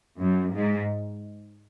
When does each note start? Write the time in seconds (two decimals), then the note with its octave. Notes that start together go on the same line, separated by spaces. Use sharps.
0.20 F#2
0.54 G#2